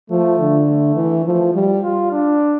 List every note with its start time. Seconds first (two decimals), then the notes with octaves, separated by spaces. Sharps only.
0.10 F3 A3
0.39 D3
0.67 A3
0.96 E3
1.25 F3 A3
1.54 G3
1.83 F4
2.11 D4